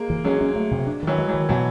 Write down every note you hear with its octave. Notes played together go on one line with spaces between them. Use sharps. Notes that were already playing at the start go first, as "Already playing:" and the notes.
Already playing: G#3 A#3
E3
F#3 G#3 C#4
C#4
A3
C3
D4
D#3 E3 F#3
G#3
E3 F#3
D#3
B2 E3 F#3